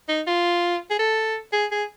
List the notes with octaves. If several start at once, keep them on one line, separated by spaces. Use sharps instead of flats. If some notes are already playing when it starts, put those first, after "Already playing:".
D#4
F4
G#4
A4
G#4
G#4